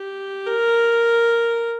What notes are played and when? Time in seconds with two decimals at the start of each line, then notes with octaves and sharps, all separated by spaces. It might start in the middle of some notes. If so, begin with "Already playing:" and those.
Already playing: G4
0.47 A#4